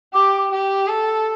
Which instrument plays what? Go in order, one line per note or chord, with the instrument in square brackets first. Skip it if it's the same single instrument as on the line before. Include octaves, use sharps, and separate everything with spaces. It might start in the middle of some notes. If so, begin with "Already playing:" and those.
[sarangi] G4 [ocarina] D6
[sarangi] G4
A4